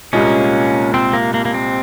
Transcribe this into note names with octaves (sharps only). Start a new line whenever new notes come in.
C2 A#2 G#3 A#3 C#4
C4
A#3
A#3
A#3
C4